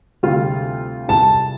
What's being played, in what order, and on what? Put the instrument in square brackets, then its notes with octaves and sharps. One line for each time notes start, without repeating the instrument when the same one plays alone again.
[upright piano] D2 C3 G3 C4 F4
[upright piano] C2 C3 G3 F4 [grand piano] A5